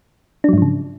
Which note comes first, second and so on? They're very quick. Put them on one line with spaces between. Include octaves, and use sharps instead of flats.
D4 F#3 G#2 F3 C#3